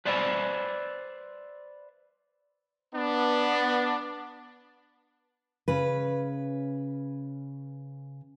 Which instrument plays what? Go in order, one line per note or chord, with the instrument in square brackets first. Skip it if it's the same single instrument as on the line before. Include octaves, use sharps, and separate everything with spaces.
[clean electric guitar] B4 C5 D5 E5 B5
[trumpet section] B3 D4
[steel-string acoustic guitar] C#3 C#4 B4